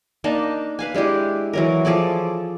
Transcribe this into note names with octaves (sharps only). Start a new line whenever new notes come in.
A#3 D4 D#4 A5
B4 F5 G#5
G#3 D4 E4 G4
E3 F#3 A#4
F3 G#4 A4 D5